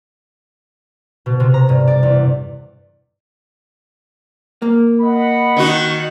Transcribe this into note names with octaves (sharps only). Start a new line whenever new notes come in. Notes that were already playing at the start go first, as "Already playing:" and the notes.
B2
C3
A#5
G2
D5
E2
A#3
D#5 F#5 B5
D#3 D#4 F#4